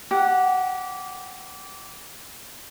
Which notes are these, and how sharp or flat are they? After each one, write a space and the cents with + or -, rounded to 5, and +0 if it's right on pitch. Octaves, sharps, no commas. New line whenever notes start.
G4 -20 F#5 +0